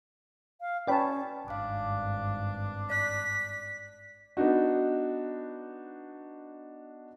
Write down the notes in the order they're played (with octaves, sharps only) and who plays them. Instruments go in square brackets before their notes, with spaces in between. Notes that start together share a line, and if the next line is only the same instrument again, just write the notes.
[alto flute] F5
[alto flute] C#4 [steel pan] B4 C#5 A5 [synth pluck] D5 G5 B5
[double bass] G#1 G2 [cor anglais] D4 [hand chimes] F5 D6
[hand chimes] D5 F#6 [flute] B6
[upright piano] B3 D4 D#4 F#4